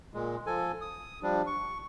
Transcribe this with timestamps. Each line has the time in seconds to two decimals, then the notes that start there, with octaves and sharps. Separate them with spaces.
0.14 A#2 G#3
0.46 F3 A4 G#5
0.81 D#6
1.23 F3 G3 D4
1.47 C#6